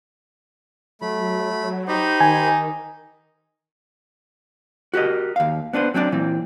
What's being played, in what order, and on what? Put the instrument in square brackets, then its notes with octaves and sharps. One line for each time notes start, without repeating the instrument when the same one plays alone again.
[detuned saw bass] F#3 [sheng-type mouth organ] A3 B5
[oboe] D#4 [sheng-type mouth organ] G4 C5 B5
[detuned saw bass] D#3 [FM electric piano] G#5
[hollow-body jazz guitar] F#4 G4 A#4 D#5
D#2 F5
B3 D4 B4 C5
F#3 C4 D4 D5
A#2 E3 C4